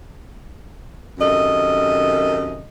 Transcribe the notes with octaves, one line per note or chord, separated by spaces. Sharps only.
F#2 C3 D#3 A4 D#5